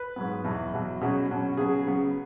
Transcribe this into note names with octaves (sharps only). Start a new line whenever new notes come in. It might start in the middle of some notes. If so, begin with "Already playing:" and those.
Already playing: B4
G#2 F#3 B3
E2 B2 F#3
E2 B2 F#3
B2 F#3 C#4 G#4
B2 F#3 C#4
C#3 F#3 B3 G#4
C#3 F#3 B3